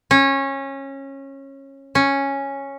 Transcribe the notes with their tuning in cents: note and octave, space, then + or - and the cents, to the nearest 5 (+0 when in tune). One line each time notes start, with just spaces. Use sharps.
C#4 -20
C#4 -5